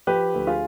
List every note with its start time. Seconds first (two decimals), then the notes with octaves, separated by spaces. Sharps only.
0.07 F3 G4 B4
0.35 D2
0.47 F4 G#4